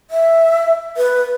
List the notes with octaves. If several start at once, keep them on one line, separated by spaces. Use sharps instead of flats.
E5
B4